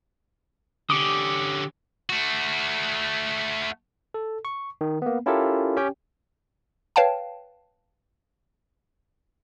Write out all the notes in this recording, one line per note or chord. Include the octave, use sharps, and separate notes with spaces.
D3 C#4 G4 D6 D#6
A3 F#4
A4
C#6
D#3
A#3 B3
C#4 E4 F4 G4 A4 A#4
C#4 G4 C#5 G5
B4 C#5 F5 G5 A5